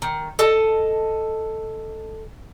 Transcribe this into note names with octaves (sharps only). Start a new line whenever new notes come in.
D#3
A4 D#5 A5